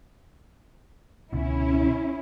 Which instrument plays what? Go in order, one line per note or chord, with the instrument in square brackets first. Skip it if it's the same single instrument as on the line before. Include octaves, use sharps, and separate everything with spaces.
[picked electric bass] C#2 B2 D3 [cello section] C#4 E4